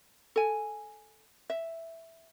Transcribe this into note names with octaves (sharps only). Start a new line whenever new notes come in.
A4 G#5
E5